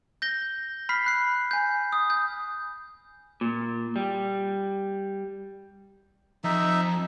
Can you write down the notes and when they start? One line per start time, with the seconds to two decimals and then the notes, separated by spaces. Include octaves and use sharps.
0.22 G6 A#6 G7
0.89 B5 F6 B6 C7
1.06 F#6 C7
1.51 G#5 G6
1.92 D#6
2.10 G6
3.41 A#2
3.96 G3
6.44 F2 D#4 E5